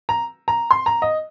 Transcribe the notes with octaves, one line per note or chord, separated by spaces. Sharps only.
A#5
A#5
C6
A#5
D#5